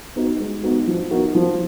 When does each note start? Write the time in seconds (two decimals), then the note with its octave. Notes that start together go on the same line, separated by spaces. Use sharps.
0.16 B3 D#4 F#4
0.39 G#3
0.63 B3 D#4 F#4
0.87 F3
1.11 B3 D#4 F#4 A#4
1.35 F3